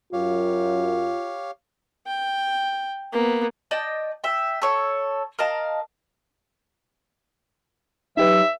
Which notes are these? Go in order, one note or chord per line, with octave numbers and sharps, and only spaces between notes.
F#2 F4 G4 C#5 F5
G5
A#3 B3
D5 D#5 G5 A5
E5 G5
A4 C#5
A#4 D#5 F5 A5
F#3 D#4 G4 B4 E5 E6